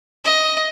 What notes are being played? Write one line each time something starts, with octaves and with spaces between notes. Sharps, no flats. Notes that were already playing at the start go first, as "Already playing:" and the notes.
D#5